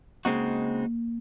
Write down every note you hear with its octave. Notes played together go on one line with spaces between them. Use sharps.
C#3 G#3 A#3 C4 D#4 F#4